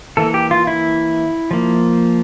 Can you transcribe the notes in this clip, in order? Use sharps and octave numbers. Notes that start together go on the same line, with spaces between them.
E3 A#3 A4
G4
F4
E4
F3 A#3